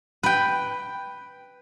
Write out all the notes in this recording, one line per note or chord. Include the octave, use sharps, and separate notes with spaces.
B4 G5